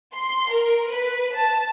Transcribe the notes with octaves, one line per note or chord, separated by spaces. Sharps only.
C6
A#4
B4
A5